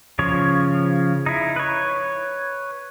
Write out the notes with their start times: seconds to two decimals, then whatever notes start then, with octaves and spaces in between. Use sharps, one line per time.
0.19 C#3 F3 C#5
1.26 D#4 E4
1.56 B4 C#5